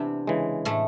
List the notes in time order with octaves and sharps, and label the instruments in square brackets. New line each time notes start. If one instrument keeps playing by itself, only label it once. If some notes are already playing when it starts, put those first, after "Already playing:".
Already playing: [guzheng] C3 C4 D4 [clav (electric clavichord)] E3 B3
[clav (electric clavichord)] C#3 E3 G#3
[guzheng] A2 A3